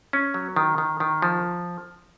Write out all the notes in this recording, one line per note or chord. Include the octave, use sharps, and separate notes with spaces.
C#4
F#3
D#3
D#3
D#3
F3